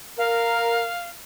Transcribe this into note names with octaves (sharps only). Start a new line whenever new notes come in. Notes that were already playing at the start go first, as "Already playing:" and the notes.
A#4 F5